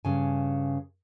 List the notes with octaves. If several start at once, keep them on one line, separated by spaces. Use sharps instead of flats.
G2 C#3 G#5